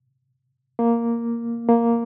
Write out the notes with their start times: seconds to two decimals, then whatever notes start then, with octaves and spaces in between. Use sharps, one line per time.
0.79 A#3
1.69 A#3